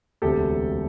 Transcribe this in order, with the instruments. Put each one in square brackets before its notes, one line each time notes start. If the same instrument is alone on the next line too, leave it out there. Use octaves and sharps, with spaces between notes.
[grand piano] E1 D2 C3 G4 A4